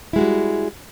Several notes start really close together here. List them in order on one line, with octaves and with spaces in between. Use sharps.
E4 G#3 F#4 G3